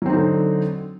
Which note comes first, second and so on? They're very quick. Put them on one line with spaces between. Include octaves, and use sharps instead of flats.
F#3 C4 D#4 D3